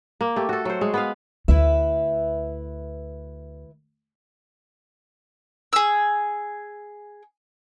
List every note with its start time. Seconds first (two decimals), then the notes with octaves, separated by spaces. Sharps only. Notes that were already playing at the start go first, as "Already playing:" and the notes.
0.21 A#3
0.36 A3 G4
0.49 F#4 A4
0.65 F#3 C5
0.81 G#3
0.94 B3 B4 F5
1.48 D2 E4 B4 E5
5.73 G#4 E6